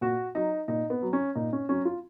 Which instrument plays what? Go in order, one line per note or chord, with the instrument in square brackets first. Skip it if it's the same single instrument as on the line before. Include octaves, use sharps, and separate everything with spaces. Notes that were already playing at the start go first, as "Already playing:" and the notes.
[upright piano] A#2 F#4
F#3 D#4
A#2 D#4
B3
F#3
C#4
A#2 D#4
C#4
F#3 C#4
F4